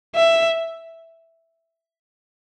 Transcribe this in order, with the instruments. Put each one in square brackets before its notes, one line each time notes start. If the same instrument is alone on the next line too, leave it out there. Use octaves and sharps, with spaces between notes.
[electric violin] E5